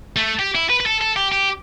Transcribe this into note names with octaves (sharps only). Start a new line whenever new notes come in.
A3
G4
E4
B4
B4
A4
A4
G4
G4